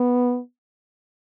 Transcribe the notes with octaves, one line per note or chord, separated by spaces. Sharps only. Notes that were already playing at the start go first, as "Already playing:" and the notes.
Already playing: B3